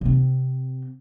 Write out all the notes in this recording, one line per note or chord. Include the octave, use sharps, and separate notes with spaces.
C3 C4